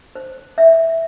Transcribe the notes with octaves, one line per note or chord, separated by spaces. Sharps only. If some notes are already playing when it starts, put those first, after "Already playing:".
C5
E5